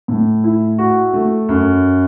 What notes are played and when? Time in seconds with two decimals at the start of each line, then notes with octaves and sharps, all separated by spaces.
0.08 A2
0.44 E4
0.78 F#4
1.14 A3
1.49 F#2